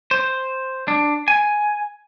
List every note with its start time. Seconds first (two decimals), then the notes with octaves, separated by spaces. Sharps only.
0.11 C5
0.88 D4
1.28 G#5